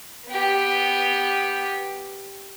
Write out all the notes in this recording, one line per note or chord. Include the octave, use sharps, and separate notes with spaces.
B3 G4